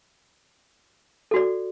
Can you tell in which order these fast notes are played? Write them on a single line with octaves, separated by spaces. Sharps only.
A4 F#4 D5